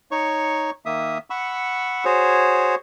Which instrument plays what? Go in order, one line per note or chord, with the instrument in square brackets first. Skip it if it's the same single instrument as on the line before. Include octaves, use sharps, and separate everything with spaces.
[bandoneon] D#4 C#5 C#6
D#3 A#3 E5 D#6
F#5 B5 C#6 E6
F#4 G#4 C5 C#5